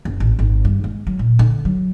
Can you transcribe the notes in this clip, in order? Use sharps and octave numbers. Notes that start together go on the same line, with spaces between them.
F#1
A1
G#1
G2
G#3
F#3
A#2
D3
F#3